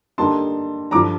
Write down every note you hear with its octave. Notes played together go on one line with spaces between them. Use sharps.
D3 G3 A#3 D#4 A5 C6
G2 D3 F3 A#5 D6